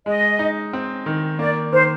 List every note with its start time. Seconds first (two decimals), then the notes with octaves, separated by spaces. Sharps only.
0.06 G#3 D#5
0.39 D#4
0.73 C4
1.06 D#3
1.39 A#3 D5
1.72 D#3 C5